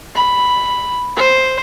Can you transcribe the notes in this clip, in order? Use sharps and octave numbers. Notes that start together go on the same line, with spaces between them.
B5
C5